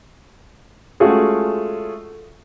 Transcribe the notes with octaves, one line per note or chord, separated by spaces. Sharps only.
G#3 A3 C#4 F4 F#4 G#4